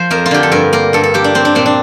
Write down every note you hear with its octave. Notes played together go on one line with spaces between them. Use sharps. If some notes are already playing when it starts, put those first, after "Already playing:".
Already playing: F3 C5
F2 A#4
F4
D3 G4
A4
G2 A#4
A#3 A#4
G2 A4
A4
A#3 G4
D4
A#3 C4
D4
A#2 C4
D4